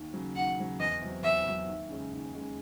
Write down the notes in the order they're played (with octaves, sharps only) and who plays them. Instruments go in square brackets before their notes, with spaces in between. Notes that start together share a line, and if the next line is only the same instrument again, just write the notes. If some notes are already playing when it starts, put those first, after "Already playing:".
Already playing: [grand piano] D#2
C#3 F#3
[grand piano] D#2 [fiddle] F#5
[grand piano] C#3 F#3
[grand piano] E2 [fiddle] D#5
[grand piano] C3 F#3
[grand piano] E2 [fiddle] E5
[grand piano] C3 F#3
D#2
C#3 G#3 C#4
D#2
C#3 G#3 C#4